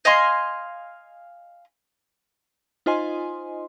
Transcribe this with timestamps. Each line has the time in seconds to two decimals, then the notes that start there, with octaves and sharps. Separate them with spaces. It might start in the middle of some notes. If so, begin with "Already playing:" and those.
0.05 D#5 F5 G#5 C6
2.86 D#4 F4 C5 D#5 G#5 C6